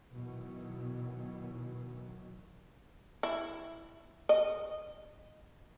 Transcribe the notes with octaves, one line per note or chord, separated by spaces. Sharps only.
B2 D#3 E3 F#3
E4
D#5